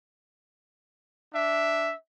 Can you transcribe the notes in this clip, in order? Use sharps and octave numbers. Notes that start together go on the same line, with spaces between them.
D4 E5